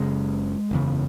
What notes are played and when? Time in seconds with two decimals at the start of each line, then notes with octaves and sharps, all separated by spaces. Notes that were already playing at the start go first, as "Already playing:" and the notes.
Already playing: F#1 C#3 G#3
0.71 F#1 E2 C#3